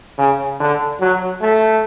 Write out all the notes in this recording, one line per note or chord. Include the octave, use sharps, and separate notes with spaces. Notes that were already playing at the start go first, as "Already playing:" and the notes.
C#3
D3
F#3
A3